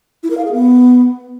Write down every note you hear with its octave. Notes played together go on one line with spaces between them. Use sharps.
E4
A#4
F5
G#4
B3